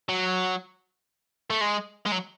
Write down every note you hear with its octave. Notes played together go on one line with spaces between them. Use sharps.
F#3
A3
G#3
G#3
F#3